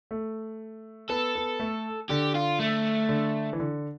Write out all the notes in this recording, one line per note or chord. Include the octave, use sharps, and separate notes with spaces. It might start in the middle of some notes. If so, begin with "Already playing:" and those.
A3
B3 A4
B3
A3
D3 G4
F4
A3
D3
E3
D3